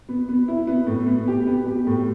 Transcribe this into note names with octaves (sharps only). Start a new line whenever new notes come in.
B3
B3
E4
B3
A2
B3
G4
B3
G4
A2